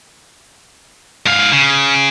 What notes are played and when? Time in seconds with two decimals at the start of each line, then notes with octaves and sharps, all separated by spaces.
1.26 G#2 F5
1.52 C#3